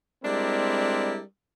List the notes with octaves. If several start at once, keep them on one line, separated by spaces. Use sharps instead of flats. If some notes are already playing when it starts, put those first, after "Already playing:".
G3 G#3 C4 D4 E4 A#4